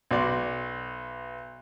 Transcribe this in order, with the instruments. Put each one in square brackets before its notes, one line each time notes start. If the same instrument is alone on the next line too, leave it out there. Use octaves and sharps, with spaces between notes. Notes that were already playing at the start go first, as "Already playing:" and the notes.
[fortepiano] B1 F#4 D5 C6